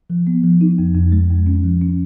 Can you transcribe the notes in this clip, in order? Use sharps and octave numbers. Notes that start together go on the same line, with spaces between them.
F3
B3
F3
D#4
F2
F2
G#3
F2
C#4
F3
C#4